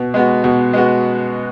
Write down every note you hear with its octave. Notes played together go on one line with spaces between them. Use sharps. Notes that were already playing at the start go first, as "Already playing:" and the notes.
Already playing: B2
G#3 B3 F#4
B2
G#3 B3 F#4